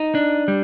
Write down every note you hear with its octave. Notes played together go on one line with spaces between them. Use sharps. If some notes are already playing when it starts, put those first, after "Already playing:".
Already playing: D#4
D4
G3